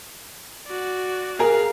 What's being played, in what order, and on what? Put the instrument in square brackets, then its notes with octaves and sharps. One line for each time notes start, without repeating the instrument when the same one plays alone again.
[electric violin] F#4 D5
[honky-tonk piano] G#4 A#4 [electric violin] F5